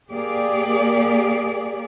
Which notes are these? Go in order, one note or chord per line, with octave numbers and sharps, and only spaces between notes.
A#3 G4 G#4 D5